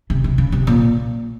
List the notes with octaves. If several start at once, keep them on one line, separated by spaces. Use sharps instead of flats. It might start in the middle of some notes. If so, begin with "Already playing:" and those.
C3
C3
C#3
C3
A#2